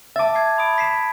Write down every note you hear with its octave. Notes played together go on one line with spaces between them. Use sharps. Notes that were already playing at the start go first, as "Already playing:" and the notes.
E5 A5 D6 A6
G#6 C7
B5 D#6 D7
B6 C7 E7